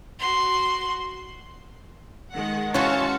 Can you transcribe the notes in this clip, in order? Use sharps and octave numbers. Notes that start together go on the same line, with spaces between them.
F#4 C6
D#3 G#3 F#5
E3 C#4 F4 F#4 A5 C#7